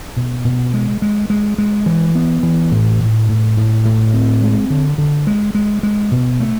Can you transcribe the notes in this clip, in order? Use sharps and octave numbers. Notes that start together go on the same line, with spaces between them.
B2
B2
G#3
G#3
G#3
G#3
E3
B3
E3
A2
A2
A2
A2
A2
C4
G#3
D3
D3
G#3
G#3
G#3
B2
A3